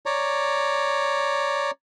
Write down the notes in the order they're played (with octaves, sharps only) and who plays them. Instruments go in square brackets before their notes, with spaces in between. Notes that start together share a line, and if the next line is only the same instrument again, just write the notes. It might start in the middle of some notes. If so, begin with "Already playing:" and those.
[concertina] C#5 D5 A#5